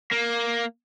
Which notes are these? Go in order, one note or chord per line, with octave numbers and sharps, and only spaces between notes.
A#3